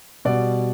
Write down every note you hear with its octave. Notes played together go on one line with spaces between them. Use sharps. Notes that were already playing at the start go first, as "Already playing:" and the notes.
B2 G3 D5